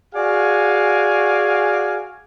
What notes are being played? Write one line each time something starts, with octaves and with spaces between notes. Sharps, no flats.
F#4 G#4 D5 F5 F#5 G#5